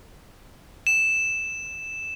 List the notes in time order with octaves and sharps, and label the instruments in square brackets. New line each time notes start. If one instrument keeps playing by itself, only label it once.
[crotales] E7